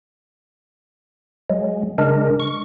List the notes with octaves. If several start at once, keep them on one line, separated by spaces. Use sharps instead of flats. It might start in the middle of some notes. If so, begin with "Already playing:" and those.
F#3 G#3
C#3 G#3 D4 A#4
C#6